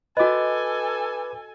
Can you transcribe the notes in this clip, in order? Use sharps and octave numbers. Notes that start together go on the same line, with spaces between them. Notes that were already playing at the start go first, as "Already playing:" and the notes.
F#4 A4 B4 D#5 G#5 D6